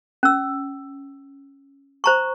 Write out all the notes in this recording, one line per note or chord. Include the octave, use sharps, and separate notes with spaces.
C#4 E6
C5 A#5 C#6